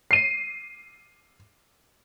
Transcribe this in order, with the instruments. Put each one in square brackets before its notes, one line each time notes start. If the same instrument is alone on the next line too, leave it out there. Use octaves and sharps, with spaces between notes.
[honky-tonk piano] C7 D#7